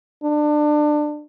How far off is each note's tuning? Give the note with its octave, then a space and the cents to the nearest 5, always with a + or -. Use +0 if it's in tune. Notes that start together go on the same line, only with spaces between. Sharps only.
D4 +25